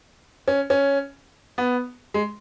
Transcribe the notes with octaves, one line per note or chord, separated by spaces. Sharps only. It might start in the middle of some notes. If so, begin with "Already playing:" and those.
C#4
C#4
B3
G#3